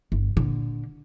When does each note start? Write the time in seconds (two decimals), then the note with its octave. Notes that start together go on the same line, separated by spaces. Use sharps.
0.12 G1
0.37 A#2 D3